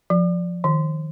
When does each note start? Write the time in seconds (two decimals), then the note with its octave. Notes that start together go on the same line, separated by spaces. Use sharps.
0.10 F3
0.64 D#3